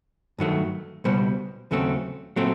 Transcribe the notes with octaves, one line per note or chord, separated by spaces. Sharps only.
G2 D#3 F#3 A3
C#2 B2 G3 B3 C5
D#2 C#3 F#3 A3 C4
A#2 F#3 A3 C4 C5